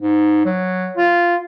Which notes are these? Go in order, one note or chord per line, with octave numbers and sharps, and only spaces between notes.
G#2
F#3
F4